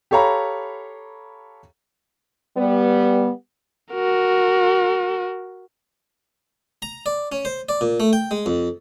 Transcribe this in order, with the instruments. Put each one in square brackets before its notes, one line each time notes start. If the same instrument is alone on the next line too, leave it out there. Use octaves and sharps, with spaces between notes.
[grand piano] G4 A4 C#5 F5 A#5 B5
[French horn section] G3 B3
[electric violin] F#4 A#4
[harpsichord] A#5
D5
C#4
C5
D5
A#2
A3
G5
G#3
F2